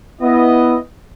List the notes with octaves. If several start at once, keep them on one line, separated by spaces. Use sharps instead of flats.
B3 E4 D#5